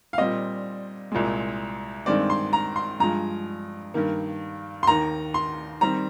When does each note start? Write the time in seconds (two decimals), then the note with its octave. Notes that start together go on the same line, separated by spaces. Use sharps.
0.13 F5
0.18 A#2 G3 C4 D#5
1.12 C2 A#2 G#3
2.06 G2 D#3 G#3 C4 D5
2.30 C6
2.53 A#5
2.76 C6
3.00 G2 F3 G#3 A#5
3.94 G2 D#3 A#3
4.83 C6
4.87 D#2 D#3 A#3 A#5
5.34 C6
5.81 D#3 G3 C4 A#5